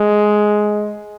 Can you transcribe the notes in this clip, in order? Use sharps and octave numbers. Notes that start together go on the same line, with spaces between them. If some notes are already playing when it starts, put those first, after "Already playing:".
Already playing: G#3